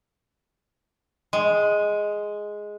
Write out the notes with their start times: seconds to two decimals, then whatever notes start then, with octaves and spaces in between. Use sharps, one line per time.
1.33 G#3